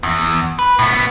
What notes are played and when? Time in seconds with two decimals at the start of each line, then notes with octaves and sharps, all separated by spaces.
0.03 E2
0.59 B4
0.79 A2 B3